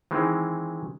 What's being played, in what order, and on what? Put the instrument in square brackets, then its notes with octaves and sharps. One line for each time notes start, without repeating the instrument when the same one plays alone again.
[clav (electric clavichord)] D#3 E3 G#3 C4